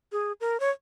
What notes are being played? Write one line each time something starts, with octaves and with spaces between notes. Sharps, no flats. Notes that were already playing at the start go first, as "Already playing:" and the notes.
G#4
A#4
C#5